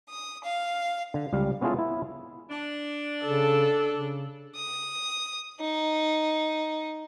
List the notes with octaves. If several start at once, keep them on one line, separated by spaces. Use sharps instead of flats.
D#6
F5
D3
C#2 G3 F5
B3 C#4 E4 F4 G#4 A4
B3 E4
D4
C#3 A4
C#3
D#6
D#4